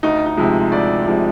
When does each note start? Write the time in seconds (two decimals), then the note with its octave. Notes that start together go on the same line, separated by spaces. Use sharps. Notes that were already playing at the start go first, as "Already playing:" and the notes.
0.03 D2 D#4
0.26 D#4
0.37 C3 F3 G#3
0.72 D2 D5
1.06 C3 F3 G#3